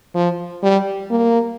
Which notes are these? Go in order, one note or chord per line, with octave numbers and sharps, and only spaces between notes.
F3
G3
A#3